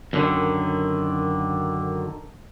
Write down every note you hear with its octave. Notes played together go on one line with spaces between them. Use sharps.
F#2 D3 D#3